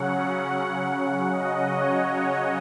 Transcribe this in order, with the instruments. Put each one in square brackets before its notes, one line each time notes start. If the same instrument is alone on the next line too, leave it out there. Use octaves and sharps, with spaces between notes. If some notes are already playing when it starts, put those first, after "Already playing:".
Already playing: [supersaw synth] C#3 F#3 C#4 F#5
F#5
D#5
C#5
D#5